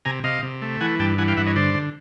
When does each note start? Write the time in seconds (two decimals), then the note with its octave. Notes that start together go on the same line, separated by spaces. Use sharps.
0.05 C3 G#5 A#5
0.24 C3 D#5 F5
0.43 C3
0.62 A3
0.81 E3 F#5 G#5
0.99 G2 G5 A5
1.18 E3 F#5 G#5
1.28 F5 G5
1.37 G2 E5 F#5
1.46 C#5 D#5
1.56 D3 C5 D5
1.74 D3